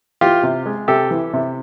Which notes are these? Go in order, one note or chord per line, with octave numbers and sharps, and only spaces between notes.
E3 F4 G4
C3
G#3
C3 G4 A4
E3
C3